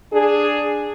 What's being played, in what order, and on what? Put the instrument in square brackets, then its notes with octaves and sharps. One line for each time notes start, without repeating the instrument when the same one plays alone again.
[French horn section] D4 G#4